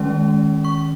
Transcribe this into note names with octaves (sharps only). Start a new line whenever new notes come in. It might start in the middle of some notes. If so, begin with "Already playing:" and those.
Already playing: D#3 G#3 C#4
C#6